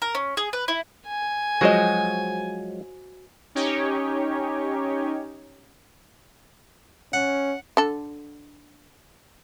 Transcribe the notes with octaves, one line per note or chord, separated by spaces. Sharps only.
A#4
C#4
G#4
B4
E4
G#5
F3 F#3 G#3 F#4 C5 D#5
C#4 D#4 G4 C#5
C#4 F#5
D3 A4